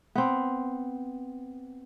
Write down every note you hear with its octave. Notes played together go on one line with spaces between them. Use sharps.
B3 C4